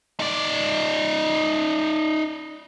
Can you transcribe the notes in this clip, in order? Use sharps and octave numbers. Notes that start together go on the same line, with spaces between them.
D#4 D5